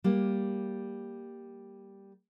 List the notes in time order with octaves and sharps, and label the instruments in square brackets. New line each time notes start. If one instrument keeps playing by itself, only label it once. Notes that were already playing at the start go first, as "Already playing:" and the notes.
[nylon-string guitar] G3 A#3